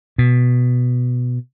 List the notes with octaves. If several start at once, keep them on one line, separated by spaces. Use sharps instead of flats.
B2